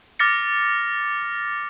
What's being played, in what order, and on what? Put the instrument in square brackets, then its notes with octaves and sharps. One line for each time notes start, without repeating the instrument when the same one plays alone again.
[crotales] D6 F6 A6 A#6 C#7